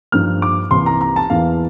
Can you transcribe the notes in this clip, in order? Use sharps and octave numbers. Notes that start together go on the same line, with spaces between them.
G2 F3 A#3 F6
D6
C2 C3 E3 A#3 C6
A#5
A#5
A5
E2 E3 A#3 F5